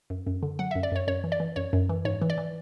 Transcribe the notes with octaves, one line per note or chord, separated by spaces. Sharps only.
F#2
F#2
D3
F#3 F#5
E5
F#2
D5
F#2 C#5
F#2 C#5
E3
D5
E3
F#2 C#5
F#2
E3
G#2 C#5
E3
D5
E3